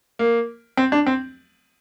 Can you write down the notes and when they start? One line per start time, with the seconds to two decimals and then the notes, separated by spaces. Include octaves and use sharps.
0.19 A#3
0.77 C4
0.92 D4
1.07 C4